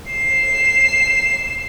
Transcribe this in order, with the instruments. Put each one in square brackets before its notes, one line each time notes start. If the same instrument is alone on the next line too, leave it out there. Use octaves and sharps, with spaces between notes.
[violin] C7 E7